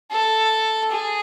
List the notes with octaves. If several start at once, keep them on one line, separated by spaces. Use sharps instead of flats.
A4
G#4